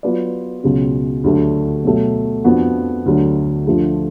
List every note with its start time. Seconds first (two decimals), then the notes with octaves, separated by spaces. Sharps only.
0.03 F#3 B3 F4 B4 D5
0.64 C#2 B2 F#3 C#4
1.24 D2 D3 F#3 A3 D4
1.84 B2 F#3 A3
2.44 F2 F3 B3 D4 F#4
3.06 D2 D3 F#3 A3
3.67 D2 D3 F3 A3 F4